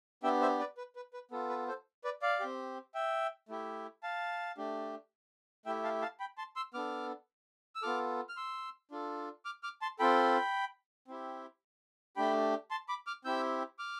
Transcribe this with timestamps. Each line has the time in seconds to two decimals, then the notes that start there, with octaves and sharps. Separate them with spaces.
0.23 B3 D4 G4 E5 G5
0.41 C5 E5
0.59 B4 D5
0.77 B4
0.96 B4
1.13 B4
1.31 B3 F4 A4
1.50 B4
1.68 A4 C5
2.04 B4 D5
2.22 D5 F5
2.40 C4 G4
2.94 E5 G5
3.49 A3 E4 G4
4.03 F5 A5
4.57 A3 D4 G4
5.66 A3 E4 G4 E5 G5
5.84 F5 A5
6.02 F5 A5
6.20 G5 B5
6.38 A5 C6
6.56 C6 E6
6.74 B3 D4 A4 D6 F6
7.75 E6
7.82 B3 F4 A4 D6 F6
8.29 F6
8.37 C6 E6
8.91 D4 F4 A4
9.45 D6 F6
9.63 D6 F6
9.82 A5 C6
9.99 C4 F4 A4 G5 B5
11.08 C4 E4 G4
12.16 A3 D4 G4 G5 B5
12.71 A5 C6
12.89 B5 D6
13.07 D6 F6
13.25 C4 E4 G4 E6 G6
13.79 D6 F6